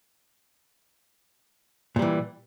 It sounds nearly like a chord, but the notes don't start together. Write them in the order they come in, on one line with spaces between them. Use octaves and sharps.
A#2 G3 E3